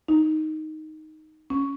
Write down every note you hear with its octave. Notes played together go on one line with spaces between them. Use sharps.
D#4
C#4